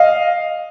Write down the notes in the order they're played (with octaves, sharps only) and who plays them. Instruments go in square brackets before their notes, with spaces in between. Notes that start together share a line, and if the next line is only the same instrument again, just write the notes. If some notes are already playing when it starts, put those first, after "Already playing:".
Already playing: [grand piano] D#5 F5